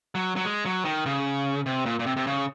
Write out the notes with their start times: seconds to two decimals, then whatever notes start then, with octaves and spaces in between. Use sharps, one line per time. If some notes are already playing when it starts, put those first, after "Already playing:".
0.15 F#3
0.36 F#3
0.45 G#3
0.65 F#3
0.85 D#3
1.06 C#3
1.66 C3
1.86 A#2
1.99 A#2
2.06 C3
2.17 C3
2.27 C#3